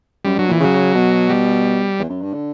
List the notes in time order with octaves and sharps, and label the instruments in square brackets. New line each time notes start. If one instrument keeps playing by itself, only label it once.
[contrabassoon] F#2 [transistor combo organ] G3
[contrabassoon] G2 [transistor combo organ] F#3
[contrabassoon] A#2 [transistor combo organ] E3
[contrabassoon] C#3 [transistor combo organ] F#3
[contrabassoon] B2
[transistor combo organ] G3
[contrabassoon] E2
F#2
G2
D3